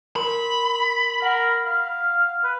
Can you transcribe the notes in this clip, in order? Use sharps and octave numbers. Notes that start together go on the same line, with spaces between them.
A#4 B5 C6
A#4 F#5
F5
B4